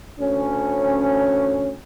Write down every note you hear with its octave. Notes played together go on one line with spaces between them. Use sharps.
D2 C#4